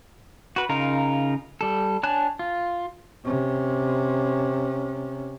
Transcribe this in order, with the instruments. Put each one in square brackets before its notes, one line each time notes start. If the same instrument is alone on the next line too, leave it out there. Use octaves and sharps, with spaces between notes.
[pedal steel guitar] F#4 B4
C#3 D#4 F4 A#4
G3 A4
D4 C#5 G#5 A5 F#6
F4
[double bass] C3 C#4